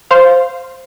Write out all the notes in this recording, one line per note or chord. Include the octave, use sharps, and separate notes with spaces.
C5 F5